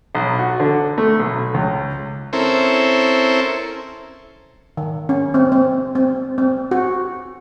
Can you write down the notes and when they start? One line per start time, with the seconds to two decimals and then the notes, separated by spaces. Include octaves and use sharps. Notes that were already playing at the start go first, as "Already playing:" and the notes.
0.15 B1
0.39 F#4
0.60 D3
0.98 A3
1.19 B1
1.54 C#2
2.33 C4 C#4 E4 A4 A#4 C5
4.77 D#3
5.09 C#4
5.34 C4
5.52 C4
5.95 C4
6.38 C4
6.71 F#4